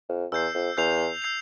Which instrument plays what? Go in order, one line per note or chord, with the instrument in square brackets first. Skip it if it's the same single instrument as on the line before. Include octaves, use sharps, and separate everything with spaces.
[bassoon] F2
[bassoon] E2 [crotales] E6 G6 C7
[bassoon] F2
[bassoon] E2 [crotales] E6 G6 C7 F7
[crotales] E6 G6 C7 F7